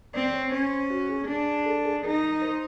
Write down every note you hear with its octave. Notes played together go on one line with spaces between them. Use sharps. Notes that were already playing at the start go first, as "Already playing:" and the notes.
C4 D5
C#5
C#4 C5
F#4
G#4
D4 G#4
A4
G#4
D#4 A#4
C5